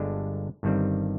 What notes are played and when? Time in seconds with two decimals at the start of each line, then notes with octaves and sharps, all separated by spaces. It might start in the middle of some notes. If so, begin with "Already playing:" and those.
Already playing: G1 G2 D3 G#3 D4
0.63 G1 G2 D#3 G3 C4